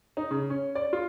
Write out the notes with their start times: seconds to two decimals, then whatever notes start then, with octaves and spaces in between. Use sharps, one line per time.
0.17 D#4
0.31 C#3
0.50 C#4
0.75 D5
0.93 F4